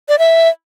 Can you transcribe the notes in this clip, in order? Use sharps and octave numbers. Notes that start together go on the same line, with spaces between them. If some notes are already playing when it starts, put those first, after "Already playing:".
D5
E5